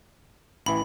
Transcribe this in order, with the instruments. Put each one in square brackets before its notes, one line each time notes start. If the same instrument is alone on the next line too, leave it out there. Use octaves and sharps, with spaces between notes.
[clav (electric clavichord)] A1 E3 [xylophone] B5